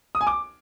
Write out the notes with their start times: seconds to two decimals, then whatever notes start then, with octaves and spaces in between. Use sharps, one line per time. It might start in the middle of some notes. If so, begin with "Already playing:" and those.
0.15 D#6
0.21 G#5
0.27 D6